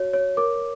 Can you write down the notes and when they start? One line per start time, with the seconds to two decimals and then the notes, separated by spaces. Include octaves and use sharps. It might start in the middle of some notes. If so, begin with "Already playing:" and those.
Already playing: F#4 C#5
0.13 C#5
0.37 A#4 D6